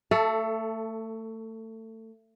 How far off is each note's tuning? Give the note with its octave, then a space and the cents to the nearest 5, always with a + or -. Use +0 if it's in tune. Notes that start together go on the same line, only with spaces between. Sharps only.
A3 +25 A4 +0